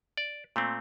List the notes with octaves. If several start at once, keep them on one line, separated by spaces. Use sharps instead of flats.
D5
A#2 A3 C4